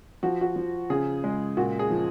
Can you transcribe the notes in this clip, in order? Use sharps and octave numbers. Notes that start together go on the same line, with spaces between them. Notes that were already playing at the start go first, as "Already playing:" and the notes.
F3 F#4
F#4
F3
C#3 G#4
G#3
A#2 F#4
G#4
F3